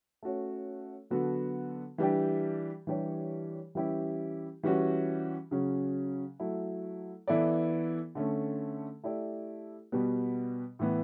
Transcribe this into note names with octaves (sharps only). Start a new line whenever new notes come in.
A3 C#4 F#4 C#5
D3 F#3 B3 F#4 A4
E3 G3 D4 G4
E3 G3 D4 G4 C#5
E3 G3 C#4 E4 G4
E3 G3 C#4 F#4
C#3 F#3 C#4
F#3 A3 E4
E3 B3 E4 A4 D5
D3 A3 C#4
A3 E4 G4 D5
B2 G3 B3
A2 E3 B3